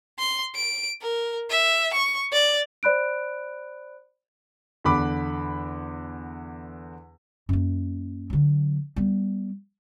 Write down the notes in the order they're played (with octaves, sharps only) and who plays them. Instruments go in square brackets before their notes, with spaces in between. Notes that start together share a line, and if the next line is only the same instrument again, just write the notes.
[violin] C6
D7
A#4
E5
C#6
D5
[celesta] C5 D5 B5 F#6 D7
[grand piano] E2 D3 B5 D6
[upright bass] F#2 A#3
D3 F#3
G3 B3